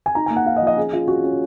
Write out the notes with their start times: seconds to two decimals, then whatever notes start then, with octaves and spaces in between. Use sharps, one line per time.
0.06 G#5
0.15 D#4 A#5
0.26 A#3 G#5
0.36 F#5
0.46 D#4 F5
0.57 D#5
0.62 F3
0.67 D#5
0.77 C#4 G#4
0.93 C#4 F4
1.08 C#4 F#4
1.24 C#4